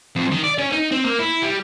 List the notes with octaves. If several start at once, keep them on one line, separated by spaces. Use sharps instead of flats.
F2
D#3
D5
C#4
D#4
C4
A#3
E4
G3